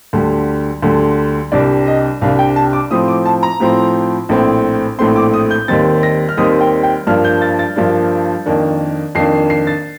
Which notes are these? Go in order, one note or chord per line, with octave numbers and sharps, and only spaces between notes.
D2 D3 G3
D2 D3 G3
C2 C3 G3 D4 D5
D#5
C2 C3 G3 D4 F5
G5
A5
D6
A2 F3 C4 D#6
D6
A5
A#5
A2 F3 C4
A#1 A2 A3 C4
A#1 A2 A3 C4 C6
D6
D#6
G6
D#2 D#3 G3 C4 A6
A#6
F6
D#2 D#3 G3 C4 D#6
G5
G5
G2 F3 A#3 D4 F6
G6
A6
A6
G2 F3 A#3 D4
F2 D#3 A#3 D4
F2 D#3 A#3 D4 C7
C7
A6